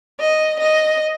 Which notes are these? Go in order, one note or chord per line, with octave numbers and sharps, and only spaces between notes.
D#5
D#5